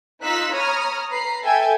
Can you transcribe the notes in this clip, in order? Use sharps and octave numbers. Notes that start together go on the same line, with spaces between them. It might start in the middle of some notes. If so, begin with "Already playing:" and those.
D#4 F4 E6 F#6 B6
C#5 A#5 B5 D#6 F6
B4 A#5 B5 C7
A4 E5 G5 G#5